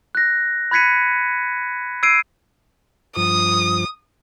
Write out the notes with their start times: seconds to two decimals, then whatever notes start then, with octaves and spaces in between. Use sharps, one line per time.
0.15 F#6 A#6
0.71 B5 F#6 G#6 B6 C#7 D#7
2.03 E6 G#6 C7 D7 D#7
3.16 G2 F3 D#6